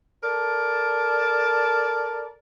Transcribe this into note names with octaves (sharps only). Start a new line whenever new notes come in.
A4 A#4 D5 A5